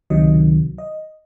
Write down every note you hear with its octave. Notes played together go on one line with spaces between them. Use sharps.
C#2 C3 D#3 F#3 D#5
D#5